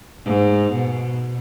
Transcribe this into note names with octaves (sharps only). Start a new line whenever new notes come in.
G#2
B2